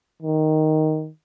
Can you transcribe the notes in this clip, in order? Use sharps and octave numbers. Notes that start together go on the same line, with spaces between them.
D#3